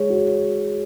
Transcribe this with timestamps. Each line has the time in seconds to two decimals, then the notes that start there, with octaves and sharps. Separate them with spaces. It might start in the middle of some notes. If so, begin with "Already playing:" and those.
Already playing: G#3 C#5
0.10 F#4